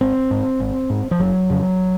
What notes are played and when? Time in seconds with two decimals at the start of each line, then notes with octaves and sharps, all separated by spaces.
0.01 G#1 C4
0.31 G#2
0.60 G#1
0.90 G#2
1.11 F3
1.19 F#1 F#3
1.50 F2 C#3